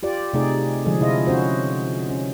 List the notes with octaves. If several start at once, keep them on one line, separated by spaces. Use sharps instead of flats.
F4 G4 D5
C3 A3 D#4 G#4 D5
D3 F3 G#3 G#4
C3 E4 F4 D#5
C#4 F#4 C5
C#4